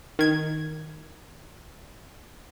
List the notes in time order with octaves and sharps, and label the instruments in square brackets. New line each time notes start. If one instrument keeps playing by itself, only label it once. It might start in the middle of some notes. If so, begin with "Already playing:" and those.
[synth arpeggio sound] D#3 G#6